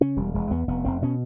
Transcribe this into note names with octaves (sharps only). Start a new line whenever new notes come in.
C#3 C#4
E1 G3
E1 G#3
E2 B3
F1 B3
F1 C4
B2 C#4